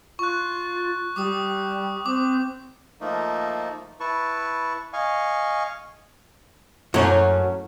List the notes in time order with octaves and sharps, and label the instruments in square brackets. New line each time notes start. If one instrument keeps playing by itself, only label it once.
[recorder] F4 [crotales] C#6 F#6
[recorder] G3 [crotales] D6 D#6
[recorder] C4 [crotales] D6
[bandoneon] F3 A3 A#3 D#4
E4 B4 A5 C#6
D#5 F5 G#5 C#6
[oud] F#2 [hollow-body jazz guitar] F#3 C#4 [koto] A3 A#3 [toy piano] E4 C#5 A5